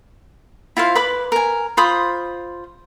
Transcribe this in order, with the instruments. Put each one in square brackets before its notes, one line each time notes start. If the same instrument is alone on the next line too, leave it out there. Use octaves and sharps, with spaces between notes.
[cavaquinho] E4 F4 C5 F5
B4 B5 D6
A#4 G#5
F4 C5 B5 D#6